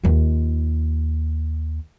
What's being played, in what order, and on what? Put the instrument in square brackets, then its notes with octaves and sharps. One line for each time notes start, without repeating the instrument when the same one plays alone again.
[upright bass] D#2 F4